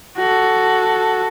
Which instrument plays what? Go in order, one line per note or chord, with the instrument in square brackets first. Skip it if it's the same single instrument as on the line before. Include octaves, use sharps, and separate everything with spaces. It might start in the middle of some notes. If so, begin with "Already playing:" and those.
[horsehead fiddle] F#4 A4